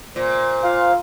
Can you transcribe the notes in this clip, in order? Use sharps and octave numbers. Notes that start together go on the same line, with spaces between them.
A#2 C5
F4 F5